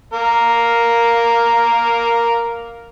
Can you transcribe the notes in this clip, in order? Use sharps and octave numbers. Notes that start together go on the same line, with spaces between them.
A#3 A#4